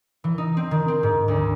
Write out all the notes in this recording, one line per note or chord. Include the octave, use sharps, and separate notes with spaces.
E3
D#4
C4
D#3
C4
G#2
D2